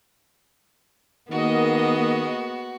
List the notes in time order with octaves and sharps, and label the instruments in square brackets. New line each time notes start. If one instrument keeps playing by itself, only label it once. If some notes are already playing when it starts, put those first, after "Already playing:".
[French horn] D#3 [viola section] A#3 G#4 D#5 [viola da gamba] B3 [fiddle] F#4